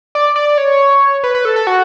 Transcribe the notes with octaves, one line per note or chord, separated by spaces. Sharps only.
D5
D5
C#5
B4
B4
A4
A4
F#4